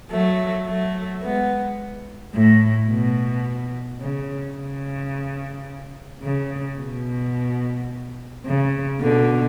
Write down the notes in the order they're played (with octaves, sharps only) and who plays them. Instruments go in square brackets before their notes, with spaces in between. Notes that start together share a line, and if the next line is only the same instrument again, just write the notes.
[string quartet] F#3 A3
F#3 A3
G#3 B3
A2
B2
C#3
C#3
C#3
B2
C#3
B2 D3